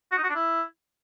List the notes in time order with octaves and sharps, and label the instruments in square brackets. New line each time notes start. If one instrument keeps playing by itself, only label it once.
[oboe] F#4
D#4
F#4
D4
E4